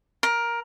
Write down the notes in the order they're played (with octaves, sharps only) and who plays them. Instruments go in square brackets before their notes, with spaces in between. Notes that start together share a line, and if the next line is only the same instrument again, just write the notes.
[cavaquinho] A#4